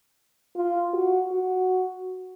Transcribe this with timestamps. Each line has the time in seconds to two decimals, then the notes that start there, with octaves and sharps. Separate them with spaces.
0.56 F4
0.94 F#4
1.32 F#4